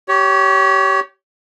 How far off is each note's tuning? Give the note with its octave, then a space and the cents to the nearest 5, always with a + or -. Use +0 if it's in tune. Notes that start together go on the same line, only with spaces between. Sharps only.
G4 -20 C#5 +15